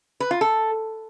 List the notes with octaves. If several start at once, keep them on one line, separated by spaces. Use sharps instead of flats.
B4
F4
A4